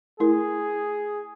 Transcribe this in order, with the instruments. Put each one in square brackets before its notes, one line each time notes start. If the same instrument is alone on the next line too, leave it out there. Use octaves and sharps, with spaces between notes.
[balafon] A3 E4 A#4 [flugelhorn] G#4